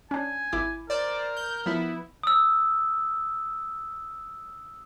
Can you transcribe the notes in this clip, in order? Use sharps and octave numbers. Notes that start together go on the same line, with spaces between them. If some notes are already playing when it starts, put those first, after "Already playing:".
C#4 D4 G#5
G#1 E4 D6
A#4 C5 D5
G6
F3 B3 E4
D#6 E6